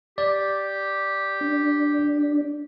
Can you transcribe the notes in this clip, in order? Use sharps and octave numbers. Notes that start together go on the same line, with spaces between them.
G4 D5
D4